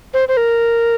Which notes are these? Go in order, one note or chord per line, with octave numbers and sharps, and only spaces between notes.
C5
C5
A#4